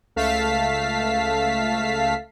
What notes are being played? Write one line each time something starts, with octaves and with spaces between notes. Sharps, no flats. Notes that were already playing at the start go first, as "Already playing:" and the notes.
C#2 A3 F5 A5 B6 C7